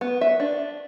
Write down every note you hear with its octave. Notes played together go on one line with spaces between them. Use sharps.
B3
E5
D4